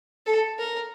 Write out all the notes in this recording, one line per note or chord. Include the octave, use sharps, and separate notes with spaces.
A4
A#4